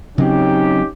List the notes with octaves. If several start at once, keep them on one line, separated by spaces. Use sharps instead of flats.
C#3 F#3 C4 C#4 D#4 G4